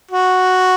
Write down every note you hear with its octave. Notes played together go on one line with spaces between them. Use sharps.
F#4